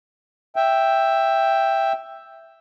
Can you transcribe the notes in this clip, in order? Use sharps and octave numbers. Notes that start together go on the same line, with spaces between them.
E5 G5